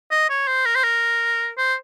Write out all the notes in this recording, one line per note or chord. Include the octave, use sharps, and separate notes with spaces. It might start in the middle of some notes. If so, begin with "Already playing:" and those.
D#5
C#5
C5
A#4
C5
A#4
C5